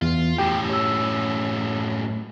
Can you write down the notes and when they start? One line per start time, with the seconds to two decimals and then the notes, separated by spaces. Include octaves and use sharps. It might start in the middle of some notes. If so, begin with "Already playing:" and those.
0.02 E2 F4
0.38 F#2 A2 G4 G5
0.69 C#5 E6